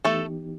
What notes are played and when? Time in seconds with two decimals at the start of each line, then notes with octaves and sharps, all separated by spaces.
0.05 E3 A3 B3 D#4 G4 A4